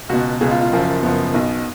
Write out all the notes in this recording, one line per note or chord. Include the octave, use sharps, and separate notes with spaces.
C#2 B2 F#4
C#2 B2 G#4
F4
F4
F#1 F#2 F3
F#1 F#2 F3 B3
B1 B2